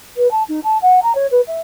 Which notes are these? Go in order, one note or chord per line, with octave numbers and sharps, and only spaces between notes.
B4
A5
D#4
A5
F#5
A#5
C#5
B4
E5